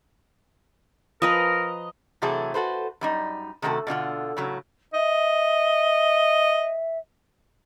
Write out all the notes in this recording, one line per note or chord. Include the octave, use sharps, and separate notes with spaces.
F3 A#4 B4 D#5 A#5
C3 E3 F#3 A3 G#4 A4
F#4 A4 B4 C5
F#2 G3 D#4
C3 D#3 A3 F#4 G#4 A4
B2 D3 F4 F#5
A2 C#3 F#3
D#5 E5